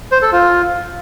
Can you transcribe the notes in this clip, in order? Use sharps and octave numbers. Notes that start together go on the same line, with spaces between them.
C5
A4
F4